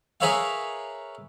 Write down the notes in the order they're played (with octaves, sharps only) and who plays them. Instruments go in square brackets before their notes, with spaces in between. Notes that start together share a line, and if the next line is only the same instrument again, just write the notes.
[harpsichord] G#4 A#4 B4 C#5 E5 F5